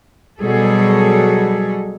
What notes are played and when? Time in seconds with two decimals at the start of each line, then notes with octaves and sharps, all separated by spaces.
0.41 B2 F#3 G3 G#4 A4